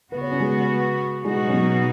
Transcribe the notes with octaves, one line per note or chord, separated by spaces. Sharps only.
C#3 B3 F#4 B4
C#5
C#4
G#3
B2 F#3 G#3 D#4 F#4
C#4
B3